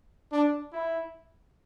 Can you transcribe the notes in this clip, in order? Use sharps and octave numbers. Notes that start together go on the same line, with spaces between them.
D4
E4